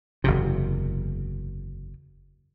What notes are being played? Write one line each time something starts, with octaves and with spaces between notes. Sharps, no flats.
F#1 E2 C3